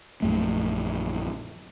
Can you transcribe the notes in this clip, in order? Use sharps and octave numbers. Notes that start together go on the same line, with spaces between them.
A#1 F#2 A3